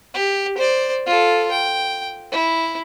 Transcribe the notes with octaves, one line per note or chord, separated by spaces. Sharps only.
G4
C5 D5
F4 A4
G5
E4